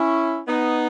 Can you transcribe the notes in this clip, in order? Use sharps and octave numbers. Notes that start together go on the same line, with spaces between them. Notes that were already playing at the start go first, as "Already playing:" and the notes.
Already playing: C#4 E4
B3 D#4